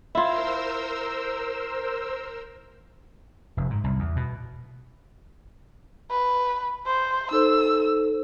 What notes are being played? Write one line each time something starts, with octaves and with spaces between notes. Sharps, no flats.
E4 F4 A#4 C5 E6
F1
G#2
C2
E2
B2
B4
C5
D#4 A4 C5 E6